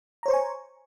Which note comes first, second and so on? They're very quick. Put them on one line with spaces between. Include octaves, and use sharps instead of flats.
A#5 C#5 C5 C#6 G#5